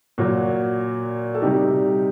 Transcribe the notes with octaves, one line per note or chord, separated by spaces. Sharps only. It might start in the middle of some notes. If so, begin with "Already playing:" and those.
A#2 F#3 F#4
A4
C3 G3 D#4 G4